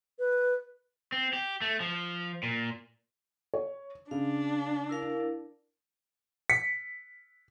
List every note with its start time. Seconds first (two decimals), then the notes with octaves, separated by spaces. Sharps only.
0.19 B4
1.12 C4
1.33 G4
1.61 A3
1.80 F3
2.43 A#2
3.54 C#5
4.11 C#3 D4 F5
4.89 E4 A#4 F5
6.50 B6 C#7